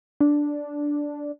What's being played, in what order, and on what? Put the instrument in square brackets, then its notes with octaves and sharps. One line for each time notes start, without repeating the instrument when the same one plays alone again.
[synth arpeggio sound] D4